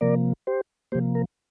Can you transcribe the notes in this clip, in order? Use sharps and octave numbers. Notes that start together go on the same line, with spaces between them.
C3 F3 A#3 A#4 D5
G4 C5
C3 F3 A#3 G4 C5
A#4